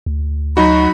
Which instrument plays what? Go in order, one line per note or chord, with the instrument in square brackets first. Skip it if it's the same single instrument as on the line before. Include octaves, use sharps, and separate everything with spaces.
[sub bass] D2
[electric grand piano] F#3 D#4 F#4 [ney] B5